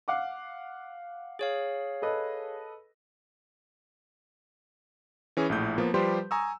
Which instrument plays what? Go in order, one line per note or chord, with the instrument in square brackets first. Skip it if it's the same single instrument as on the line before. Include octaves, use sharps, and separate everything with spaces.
[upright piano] F5 F#5 D6
[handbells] G#4 C#5 F5
[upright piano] A4 B4 D#5
[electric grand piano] E3 C#4 G#4
A#1 A2 G6
F3 A#3 B3
F3 G3 G4 B4 C5 C6
G#5 A#5 C#6 D#6 E6